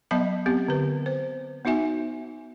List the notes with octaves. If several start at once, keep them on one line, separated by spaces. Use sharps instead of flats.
F#3 B3 D#5 E5 A5 B5
B3 C4 G4
D3 B4
C5
B3 D#4 F#4 E5 G#5